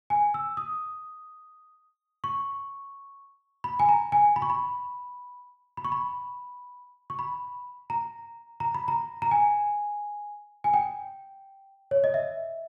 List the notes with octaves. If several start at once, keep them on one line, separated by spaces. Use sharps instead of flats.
G#5
E6
D#6
C#6
B5
G#5
A#5
G#5
B5
C#6
B5
B5
C#6
B5
C#6
B5
A#5
A#5
B5
A#5
A#5
G#5
G#5
G5
C#5
D#5
E5